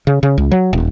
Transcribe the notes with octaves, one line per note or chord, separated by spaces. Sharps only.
C#3
C#3
C#2
F#3
D#1